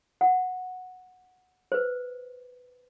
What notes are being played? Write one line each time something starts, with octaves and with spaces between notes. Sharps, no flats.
F#5
B4 C5